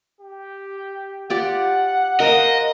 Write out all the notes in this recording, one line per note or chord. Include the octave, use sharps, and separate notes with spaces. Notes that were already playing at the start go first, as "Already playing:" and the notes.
G4
F4 G4 D5 F#5
A#4 C5 D#5 F5